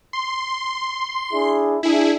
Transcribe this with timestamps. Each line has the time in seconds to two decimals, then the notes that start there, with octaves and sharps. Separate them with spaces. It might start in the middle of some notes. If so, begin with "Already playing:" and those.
0.13 C6
1.32 D4 E4 G#4
1.83 D4 E4 G#4